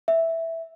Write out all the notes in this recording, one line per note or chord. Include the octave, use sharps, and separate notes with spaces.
E5